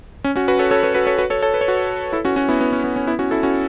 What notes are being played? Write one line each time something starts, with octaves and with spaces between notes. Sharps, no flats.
C#4
C#4 F#4
F#4 B4
A4 C#5
A4 C#5
F#4 B4
F#4 B4
A4 C#5
F#4 B4
A4 C#5
A4 C#5
B4
C#5
F#4 B4
E4 A4
C#4 F#4
C#4 F#4
B3 E4
B3
C#4
B3
C#4
B3 E4
C#4 F#4
E4 A4
C#4 F#4